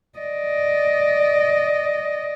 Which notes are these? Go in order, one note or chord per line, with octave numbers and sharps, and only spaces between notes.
D5 D#5